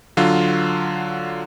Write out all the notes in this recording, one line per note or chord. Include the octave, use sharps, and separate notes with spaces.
D3 F#3 F4